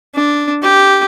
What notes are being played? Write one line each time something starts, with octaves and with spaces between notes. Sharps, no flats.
D4
G4